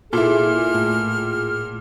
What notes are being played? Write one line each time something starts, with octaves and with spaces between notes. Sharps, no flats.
A#2 E4 G#4 A4 F6
A2